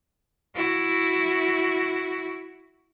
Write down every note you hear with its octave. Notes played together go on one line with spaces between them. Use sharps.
E4 F#4